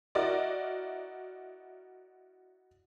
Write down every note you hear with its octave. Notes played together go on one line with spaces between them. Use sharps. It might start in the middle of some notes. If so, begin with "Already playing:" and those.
E4 F#4 A#4 D5 D#5